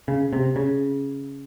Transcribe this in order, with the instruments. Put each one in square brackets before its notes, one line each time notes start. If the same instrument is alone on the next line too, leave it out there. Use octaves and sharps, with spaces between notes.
[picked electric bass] C#3
C3
C#3